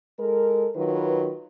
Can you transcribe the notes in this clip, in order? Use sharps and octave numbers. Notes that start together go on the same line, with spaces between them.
G#3 A4 A#4
D#3 F#3 F4 B4